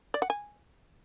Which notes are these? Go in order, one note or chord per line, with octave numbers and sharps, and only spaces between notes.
D5
F#5
G#5